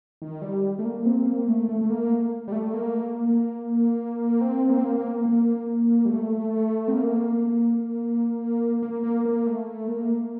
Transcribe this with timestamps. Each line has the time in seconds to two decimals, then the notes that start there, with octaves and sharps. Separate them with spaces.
0.22 D#3
0.42 G3
0.79 A3
0.85 A#3
1.06 C4
1.26 A#3
1.47 A3
1.69 A3
1.81 A3
1.90 A#3
2.48 G3
2.52 A3
2.74 A#3
4.41 C4
4.70 A#3
4.78 C4
4.85 A#3
4.97 A#3
5.26 A#3
6.05 G3
6.10 A3
6.88 C4
6.93 A#3
8.82 A#3
9.03 A#3
9.25 A#3
9.46 A3
9.88 A#3